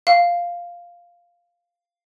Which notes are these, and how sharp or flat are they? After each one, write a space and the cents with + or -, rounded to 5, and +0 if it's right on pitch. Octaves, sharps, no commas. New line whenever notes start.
F5 +0